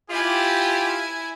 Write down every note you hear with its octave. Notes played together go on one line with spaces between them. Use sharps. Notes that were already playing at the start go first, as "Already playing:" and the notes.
E4 F4 G4 G#5